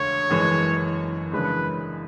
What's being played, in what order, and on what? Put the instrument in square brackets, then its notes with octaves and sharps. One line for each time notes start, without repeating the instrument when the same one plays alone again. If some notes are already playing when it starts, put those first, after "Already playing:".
Already playing: [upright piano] E1 D2 C#3 [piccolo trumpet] C#5
[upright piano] F#1 F#2 E3 G#3
[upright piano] F#2 C#3 E3 G#3 D4 [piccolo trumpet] B4